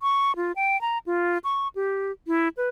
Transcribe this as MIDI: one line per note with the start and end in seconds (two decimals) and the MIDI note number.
0.01 0.35 85
0.36 0.52 65
0.56 0.80 79
0.81 0.98 82
1.06 1.38 65
1.44 1.68 85
1.75 2.12 67
2.27 2.49 64
2.57 2.69 71